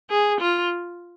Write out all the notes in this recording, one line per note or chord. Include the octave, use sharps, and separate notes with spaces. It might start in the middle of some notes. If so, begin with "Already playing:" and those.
G#4
F4